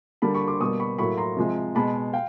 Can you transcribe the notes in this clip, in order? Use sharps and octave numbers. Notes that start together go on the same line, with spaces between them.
D3 G3 A#3 A5 B5
B5 C#6
C6 D6
B2 G3 A#3 C#6 D#6
B5 C#6
A2 F#3 A#3 B5 C#6
A#5 C6
C3 F3 G#3
B2 G#3 A5 B5
F5 G5